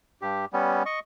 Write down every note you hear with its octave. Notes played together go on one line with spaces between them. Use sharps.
G2 G4
G3 B3 C#4
D#5 C#6